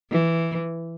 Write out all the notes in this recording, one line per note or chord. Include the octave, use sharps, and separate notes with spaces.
E3